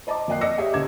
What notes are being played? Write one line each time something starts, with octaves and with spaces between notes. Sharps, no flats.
C5 D#5 A5 A#5 D6
F2 A#3 D#5 G5 F#6 C7
D5 D#5 D6 E6 A#6 C#7
G4 G#4 C#5 D#5 E5
D#1 C#3 D6 G#6 E7